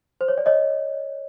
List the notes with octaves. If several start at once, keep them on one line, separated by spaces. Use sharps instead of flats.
C5
C#5
D5
C#5 D#5